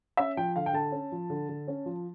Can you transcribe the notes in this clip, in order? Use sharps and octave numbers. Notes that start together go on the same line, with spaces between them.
C#4 E5
F3 G5
D3 F5
G5
D3 A5
C#4
F3
D3
D3
C#4
F3